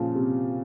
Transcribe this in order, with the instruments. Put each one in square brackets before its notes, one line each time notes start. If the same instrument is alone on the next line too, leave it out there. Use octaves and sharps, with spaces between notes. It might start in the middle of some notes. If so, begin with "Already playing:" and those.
Already playing: [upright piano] A#2 C#3 F3
C3